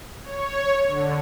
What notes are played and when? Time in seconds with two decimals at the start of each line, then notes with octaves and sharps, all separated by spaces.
0.22 C#5
0.88 D3